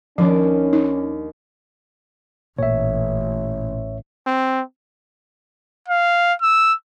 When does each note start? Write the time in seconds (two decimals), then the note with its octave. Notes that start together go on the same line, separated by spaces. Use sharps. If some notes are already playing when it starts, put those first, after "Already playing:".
0.18 D#2 F3 C#4 D4 D6
0.73 D#4
2.59 A1 A#2 C#5 E5
4.26 C4
5.88 F5
6.42 E6